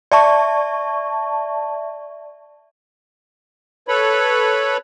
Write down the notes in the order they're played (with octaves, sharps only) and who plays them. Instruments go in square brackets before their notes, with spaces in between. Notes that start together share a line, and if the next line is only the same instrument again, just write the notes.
[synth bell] D5 E5 A5 C#6
[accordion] A4 B4 C#5 B5